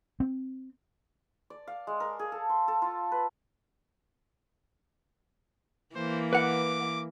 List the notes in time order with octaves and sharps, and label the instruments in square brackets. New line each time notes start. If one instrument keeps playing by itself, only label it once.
[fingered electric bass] C4
[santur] D5
F5
G#3
A#4
G#4
A4
C6
A4
F4
B4
[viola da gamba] E3 A#3 [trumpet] C5
[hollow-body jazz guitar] B4 F#5 [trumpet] D6